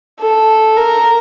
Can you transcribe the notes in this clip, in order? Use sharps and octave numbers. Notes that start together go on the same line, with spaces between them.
A4
A#4